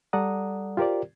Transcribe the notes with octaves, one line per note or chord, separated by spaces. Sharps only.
G3 A4 D5 F#5 A#5 D#6
F4 G4 A#4 C5 D5